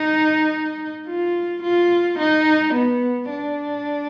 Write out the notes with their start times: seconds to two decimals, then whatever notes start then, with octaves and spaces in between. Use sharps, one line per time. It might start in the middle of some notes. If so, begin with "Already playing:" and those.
Already playing: D#4
1.07 F4
1.63 F4
2.19 D#4
2.74 B3
3.30 D4